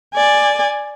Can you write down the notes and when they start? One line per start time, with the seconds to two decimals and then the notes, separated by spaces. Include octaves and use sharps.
0.14 D5 G#5